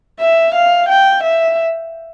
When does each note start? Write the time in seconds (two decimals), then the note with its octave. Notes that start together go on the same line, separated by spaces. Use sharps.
0.20 E5
0.55 F5
0.89 G5
1.23 E5